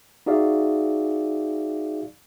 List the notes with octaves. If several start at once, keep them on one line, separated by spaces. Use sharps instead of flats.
D#4 F#4 G#4 D5 E5 F5